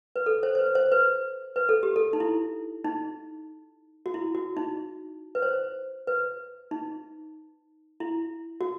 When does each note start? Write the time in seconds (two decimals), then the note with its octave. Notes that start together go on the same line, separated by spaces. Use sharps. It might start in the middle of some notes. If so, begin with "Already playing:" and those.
0.16 B4
0.26 A4
0.43 C5
0.55 C5
0.59 B4
0.75 C5
0.92 B4
1.56 B4
1.69 A4
1.83 G4
1.96 A4
2.13 D#4
2.20 E4
2.84 D#4
4.06 F#4
4.14 E4
4.35 F#4
4.57 D#4
5.35 B4
5.42 C5
6.07 B4
6.71 D#4
8.00 E4
8.61 F#4